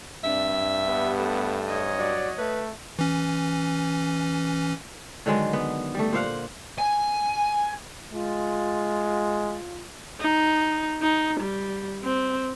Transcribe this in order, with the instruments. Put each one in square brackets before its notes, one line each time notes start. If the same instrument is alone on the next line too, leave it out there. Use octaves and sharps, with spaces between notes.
[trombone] G2 [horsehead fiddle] C4 D4 [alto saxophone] E5
[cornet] B3 [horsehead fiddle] G4
[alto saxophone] A3
[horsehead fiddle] C#5 D#5
[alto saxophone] F#3 [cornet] D5
[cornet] A3 [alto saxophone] B4
[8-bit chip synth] E3 C#4
[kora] D3 D#3 F#3 G#3
B3
G3 A3
A#2 C5 F5 F#5
[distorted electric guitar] G#5
[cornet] G#3 [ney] F4
[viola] D#4
D#4
G3
C4